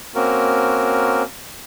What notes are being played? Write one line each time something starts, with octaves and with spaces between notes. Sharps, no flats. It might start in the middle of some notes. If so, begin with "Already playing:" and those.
A#3 C4 C#4 F#4 A#4